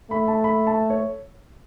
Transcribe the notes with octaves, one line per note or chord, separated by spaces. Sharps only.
A3 B5
A5
B5
A5
C#5